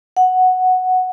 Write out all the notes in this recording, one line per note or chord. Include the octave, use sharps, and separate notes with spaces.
F#5